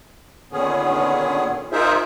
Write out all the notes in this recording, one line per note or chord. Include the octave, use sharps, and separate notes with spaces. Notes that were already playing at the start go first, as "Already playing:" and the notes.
A#2 D3 D#3 B3 C#4 G#4
D#4 F4 G#4 A#4 C5 E5